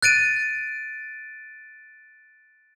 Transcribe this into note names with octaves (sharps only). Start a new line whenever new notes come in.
F#6 A6 D7 D#7